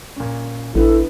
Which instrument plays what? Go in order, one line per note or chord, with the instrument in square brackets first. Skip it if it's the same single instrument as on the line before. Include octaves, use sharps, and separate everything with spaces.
[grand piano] A#2 C#4
[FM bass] A1 [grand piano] D3 B3 [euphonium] E4 [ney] A4